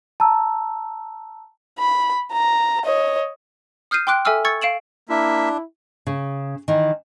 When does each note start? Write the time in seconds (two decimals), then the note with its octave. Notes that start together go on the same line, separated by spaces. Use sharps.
0.20 A5 A#5 E6
1.79 B5
2.33 A#5
2.84 C#5 D#5
3.91 D#6 F6 G6 C7 D#7
4.07 G5 C6 D6 F#6 D7
4.25 A4 E5 G#5 D6 E6 F6
4.45 C#6 E6 G#6 A6 C#7
4.61 F5 D7 E7 F#7
5.09 A#3 D4 E4 E5
6.07 C#3
6.68 D#3 E3